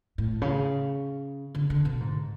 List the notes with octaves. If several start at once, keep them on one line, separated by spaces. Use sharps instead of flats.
A2
C#3
D3
D3
B2
G#2